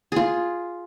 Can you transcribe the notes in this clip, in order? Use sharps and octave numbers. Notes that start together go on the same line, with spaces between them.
F4 G#4